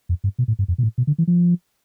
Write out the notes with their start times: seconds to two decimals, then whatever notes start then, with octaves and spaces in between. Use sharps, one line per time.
0.09 F2
0.24 G2
0.39 B2
0.48 A2
0.59 G2
0.68 F2
0.78 B2
0.83 A2
0.98 B2
1.07 D3
1.18 E3
1.27 F3